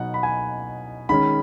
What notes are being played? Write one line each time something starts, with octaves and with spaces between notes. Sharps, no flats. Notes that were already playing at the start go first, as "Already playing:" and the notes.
Already playing: B2 F#3 B3 D#4 F#5
B5
G#5
D#3 G#3 C#4 B5